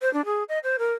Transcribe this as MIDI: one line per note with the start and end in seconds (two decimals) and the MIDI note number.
0.02 0.12 72
0.13 0.24 62
0.25 0.43 68
0.49 0.59 75
0.64 0.77 72
0.79 0.93 70